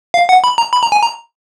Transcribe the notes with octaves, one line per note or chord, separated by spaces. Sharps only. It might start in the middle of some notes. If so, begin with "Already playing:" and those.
F5
F#5
B5
A#5
B5
A#5
G#5
A#5